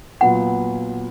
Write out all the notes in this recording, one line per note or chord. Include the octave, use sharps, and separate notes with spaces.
A#2 F#3 B3 F4 F#5